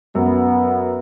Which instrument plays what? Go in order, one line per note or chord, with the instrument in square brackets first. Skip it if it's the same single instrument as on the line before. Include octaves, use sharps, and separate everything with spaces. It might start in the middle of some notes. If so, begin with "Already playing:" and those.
[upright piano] F#2 [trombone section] B3